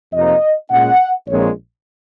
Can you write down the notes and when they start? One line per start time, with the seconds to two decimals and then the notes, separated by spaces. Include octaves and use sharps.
0.13 F2 C3 F3 A#3 D#4 D#5
0.71 A#2 G#3 C#4 F#5
1.29 A#1 A#2 G#3 C4 C#5